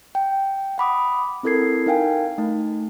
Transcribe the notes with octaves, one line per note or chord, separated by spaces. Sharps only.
G5
F#5 B5 D6 D#6
C4 E4 A4 A#4 G#6 C7
D#4 A#4 F5 G5 G#5
A3 D#4